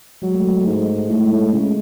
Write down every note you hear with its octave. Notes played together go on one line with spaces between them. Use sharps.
F#3 G#3
A3
G#3
A3
G#2
G#3
A3
G#3
A2 A3
G#3
A2 A3
G#3
C#3